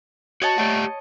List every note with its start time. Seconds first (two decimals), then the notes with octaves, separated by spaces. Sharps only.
0.42 F#4 C#5 D#5 A5
0.58 A3 G4 D5 F#5